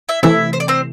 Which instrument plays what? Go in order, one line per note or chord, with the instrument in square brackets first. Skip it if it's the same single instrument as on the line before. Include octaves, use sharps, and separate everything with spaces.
[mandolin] E4 E5
[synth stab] C3 E3 A3 [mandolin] E4 E5
[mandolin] C5
D5
C4 C5